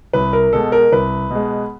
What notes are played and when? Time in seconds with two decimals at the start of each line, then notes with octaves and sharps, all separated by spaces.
0.13 C2 B4
0.33 A#4
0.53 B2 G#3 A4
0.72 A#4
0.92 C2 B4
1.30 B2 G#3